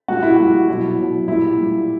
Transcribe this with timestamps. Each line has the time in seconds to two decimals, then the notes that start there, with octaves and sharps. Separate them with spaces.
0.08 A#2 G3 F#4
0.23 E4
0.36 A#2 G3 F#4
0.68 B2 F#3 E4
0.98 B2 F#3
1.28 A#2 G3 E4
1.58 A#2 G3